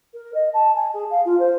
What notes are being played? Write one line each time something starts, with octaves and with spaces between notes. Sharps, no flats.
A#4
D#5
A5
G#5
G#4
F5
F4
C5